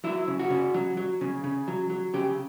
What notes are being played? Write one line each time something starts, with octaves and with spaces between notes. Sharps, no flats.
F#3 E4
C#3
F#4
C#3
F#3
F#3
C#3
C#3
F#3
F#3
C#3 G4